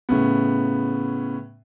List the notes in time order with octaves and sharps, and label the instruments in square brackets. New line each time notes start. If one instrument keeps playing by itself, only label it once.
[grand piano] A2 C#3 B3